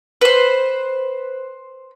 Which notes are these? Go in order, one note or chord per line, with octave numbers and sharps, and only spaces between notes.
B4 C5